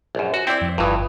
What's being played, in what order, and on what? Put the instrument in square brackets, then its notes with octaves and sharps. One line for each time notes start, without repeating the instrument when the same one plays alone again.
[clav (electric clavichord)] A#1 F#2
F#4
[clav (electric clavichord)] C4 E4 [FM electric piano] D5 G5
[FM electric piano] F2
[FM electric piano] G1 F4 D#6 [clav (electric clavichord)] G2 E3